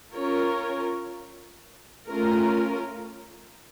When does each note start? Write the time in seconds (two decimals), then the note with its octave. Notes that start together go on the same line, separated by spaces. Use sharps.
0.14 C#4 F4 A#4 C#5
2.08 A3 C#4 F4 A#4